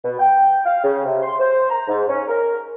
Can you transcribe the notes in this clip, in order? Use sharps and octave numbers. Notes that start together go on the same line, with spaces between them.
B2
G5
F5
C#3
C3
C6
C5
A#5
G#2
C#4
A#4